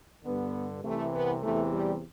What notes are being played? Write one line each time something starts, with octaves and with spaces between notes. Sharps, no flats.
G2 D3 B3
C2 C3 E3 A3
B3
E2 C3 E3 A3
G3